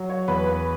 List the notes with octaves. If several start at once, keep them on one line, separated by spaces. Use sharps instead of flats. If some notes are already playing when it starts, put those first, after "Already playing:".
Already playing: F#3
C#5
E2 B4
B4